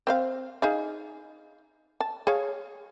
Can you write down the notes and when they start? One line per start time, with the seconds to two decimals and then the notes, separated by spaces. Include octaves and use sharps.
0.07 C4 C5 F5
0.62 D#4 G#4 F5
2.00 A5
2.27 G#4 C#5 F5